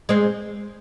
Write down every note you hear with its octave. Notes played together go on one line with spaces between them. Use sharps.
G#3 C4